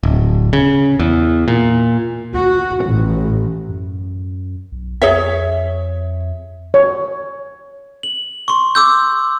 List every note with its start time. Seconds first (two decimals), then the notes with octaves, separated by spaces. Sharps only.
0.03 D1
0.53 C#3
0.99 E2
1.48 A#2
2.32 F#4
2.84 A1
3.69 F#2
4.72 B1
5.02 F2 G#4 C#5 E5
6.74 C#5
8.03 F#7
8.48 C6 C#6
8.75 D6 E6 G6